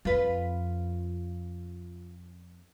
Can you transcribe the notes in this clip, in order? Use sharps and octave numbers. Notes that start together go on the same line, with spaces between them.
F2 F4 B4